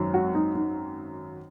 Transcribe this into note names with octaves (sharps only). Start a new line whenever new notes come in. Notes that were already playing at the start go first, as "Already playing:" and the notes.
Already playing: G#1 F#2 D#3 F#3
F#4
D#4
D#4